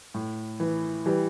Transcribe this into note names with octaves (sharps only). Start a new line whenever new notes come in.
A2
E3
E3 G3